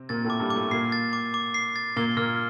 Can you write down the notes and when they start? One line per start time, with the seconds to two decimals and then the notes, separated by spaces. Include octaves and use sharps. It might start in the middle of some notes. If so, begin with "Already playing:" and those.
Already playing: C3 C4
0.09 A#2 A#3 A6
0.24 A2 A3
0.30 D6
0.40 G2 G3
0.50 D6
0.56 A2 A3
0.71 A#2 A#3 C7
0.92 A6
1.13 D6
1.34 D6
1.54 C7
1.76 A6
1.96 A#2 A#3 G7
2.17 A#2 A#3 F6